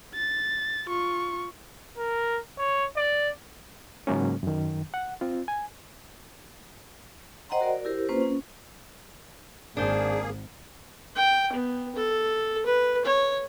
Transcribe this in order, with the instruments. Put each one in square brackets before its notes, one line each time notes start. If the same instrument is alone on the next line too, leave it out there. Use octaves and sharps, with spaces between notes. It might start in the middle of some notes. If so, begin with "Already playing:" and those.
[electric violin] A6
F4 C#6
[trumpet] A#4
C#5
D5
[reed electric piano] G#2 C#3 F#3 G#3 A#3 C#4
F#2 D#3
F#5
C4 F4
G#5
[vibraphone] C5 D#5 F#5 G5 A#5 C6
F#4 A#4 D5
E4 G4 A#4 C5
A#3 C4 C#4 F4 B4 C5
C#4
[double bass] G#1 [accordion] A#3 G#4 [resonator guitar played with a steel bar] D4 C5
[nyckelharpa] G5
B3
A4
B4
C#5